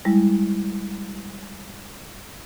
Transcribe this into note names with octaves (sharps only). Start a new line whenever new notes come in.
G3 G#3 E4